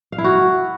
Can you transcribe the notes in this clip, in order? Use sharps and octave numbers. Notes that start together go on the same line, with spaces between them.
F5
E4
F#4